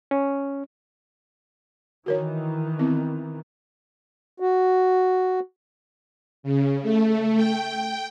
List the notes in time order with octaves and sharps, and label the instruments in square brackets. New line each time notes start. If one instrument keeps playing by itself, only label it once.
[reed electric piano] C#4
[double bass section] D#3 E3 [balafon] F#4 A#4 C#5
[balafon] B3 C4 E4
[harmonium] F#4
[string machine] C#3
A3
G5